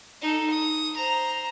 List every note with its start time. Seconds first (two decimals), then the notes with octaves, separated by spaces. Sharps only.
0.21 D#4 A4
0.50 D#6
0.97 C5 A#5